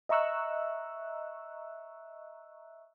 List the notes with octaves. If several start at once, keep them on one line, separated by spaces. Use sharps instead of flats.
D#5 E5 A#5 C#6 E6 F#6